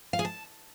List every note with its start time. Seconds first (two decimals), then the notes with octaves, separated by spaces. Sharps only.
0.13 F5
0.19 G#4
0.25 A5